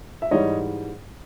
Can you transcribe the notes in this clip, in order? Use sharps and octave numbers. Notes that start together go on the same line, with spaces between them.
E5
G#2 E3 G3 C#5 D#5